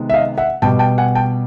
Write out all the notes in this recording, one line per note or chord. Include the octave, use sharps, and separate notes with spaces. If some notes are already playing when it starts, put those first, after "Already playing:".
Already playing: C3 D#3 G#3 B3
E5
D#5 F5
E5 F#5
B2 G3 B3 G5 A5
G5 A5
F#5 G#5
G5 A5